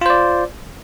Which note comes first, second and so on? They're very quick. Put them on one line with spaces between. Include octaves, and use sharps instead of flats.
F4 C5 D5